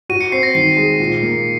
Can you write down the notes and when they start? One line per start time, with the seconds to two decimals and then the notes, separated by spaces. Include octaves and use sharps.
0.09 F#4 D#7
0.21 C#7
0.32 C4 C7
0.43 A#6
0.55 D#3 C7
0.77 G#3
1.00 A#2
1.23 A#3